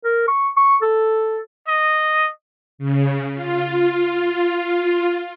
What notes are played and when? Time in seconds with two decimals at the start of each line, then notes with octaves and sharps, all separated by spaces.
0.05 A#4
0.28 C#6
0.57 C#6
0.82 A4
1.68 D#5
2.78 C#3
3.34 F4